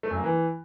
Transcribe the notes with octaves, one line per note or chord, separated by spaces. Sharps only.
A3
F#2
A#3
E3